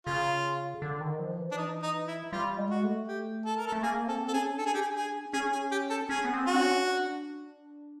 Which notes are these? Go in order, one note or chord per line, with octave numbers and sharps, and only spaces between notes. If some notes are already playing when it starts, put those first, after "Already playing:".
C#3 F4
D3
D#3
F3
E3
D4
D#4
D#4
E4
G3 F4
G#3
F#4
A3
G4
A4
A#4
A4
A3
A#3 G#4
C4 A4
A4
C#4 G#4
D4 A4
G#4
G4
G#4
G#4
C#4 G#4
G#4
G4
A4
C#4 G#4
B3
C4
F#4
D4
C#4
D4